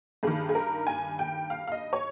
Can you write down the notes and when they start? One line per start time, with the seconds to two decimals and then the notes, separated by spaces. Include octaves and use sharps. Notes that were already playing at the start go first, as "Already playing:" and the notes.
0.23 G2 D#3 G#4
0.49 G#4
0.55 A#4
0.87 G#5
1.19 G5
1.50 F5
1.67 F5
1.72 D#5
1.93 C#5